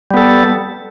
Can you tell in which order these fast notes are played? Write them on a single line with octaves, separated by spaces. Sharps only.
G3 B3 A4